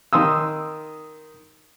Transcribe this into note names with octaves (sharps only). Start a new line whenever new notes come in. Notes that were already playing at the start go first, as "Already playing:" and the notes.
D#3 C6 D#6 E6